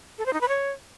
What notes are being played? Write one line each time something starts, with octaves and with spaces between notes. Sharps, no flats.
A4
C5
D#4
B4
C#5